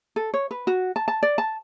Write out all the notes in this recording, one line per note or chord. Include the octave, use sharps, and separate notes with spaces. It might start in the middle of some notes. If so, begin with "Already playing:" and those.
A4
C#5
B4
F#4
A5
A5
D5
A5